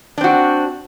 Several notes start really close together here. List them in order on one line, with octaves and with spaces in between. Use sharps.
D4 C4 F#4